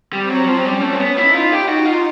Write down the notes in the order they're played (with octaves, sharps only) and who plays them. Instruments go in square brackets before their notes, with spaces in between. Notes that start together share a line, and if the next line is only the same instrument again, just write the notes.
[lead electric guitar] G3 [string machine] C4
[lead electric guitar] F#3
F3
F#3
[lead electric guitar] G3 [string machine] C#4
[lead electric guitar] A3
C4
B3
[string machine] D#4 [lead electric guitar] E4
[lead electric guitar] F4
G4
[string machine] D#4 [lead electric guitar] F#4
[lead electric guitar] F4